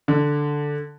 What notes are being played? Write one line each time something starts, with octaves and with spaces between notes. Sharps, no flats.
D3